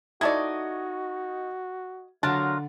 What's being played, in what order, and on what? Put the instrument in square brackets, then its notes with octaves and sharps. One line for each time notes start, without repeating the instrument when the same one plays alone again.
[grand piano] D#4 C#6 G#6 [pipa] E4 A4 D5 [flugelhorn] F#4 [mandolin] D#5
[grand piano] D3 [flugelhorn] F#3 [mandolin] D4 F4 A#4 [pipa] A5